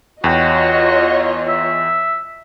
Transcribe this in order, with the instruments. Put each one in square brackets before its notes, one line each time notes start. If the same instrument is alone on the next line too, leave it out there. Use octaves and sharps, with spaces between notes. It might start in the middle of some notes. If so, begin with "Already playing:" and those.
[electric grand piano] E2 G5 [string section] F4 C#5 D#5 [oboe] F#4
[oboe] E5